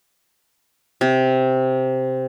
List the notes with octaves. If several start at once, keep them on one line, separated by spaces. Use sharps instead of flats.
C3